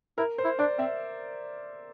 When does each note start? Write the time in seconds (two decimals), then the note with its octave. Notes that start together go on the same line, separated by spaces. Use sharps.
0.18 E4 A#4
0.38 C5
0.45 E4
0.59 D4 D5
0.78 C4 E5